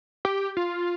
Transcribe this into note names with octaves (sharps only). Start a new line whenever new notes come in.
G4
F4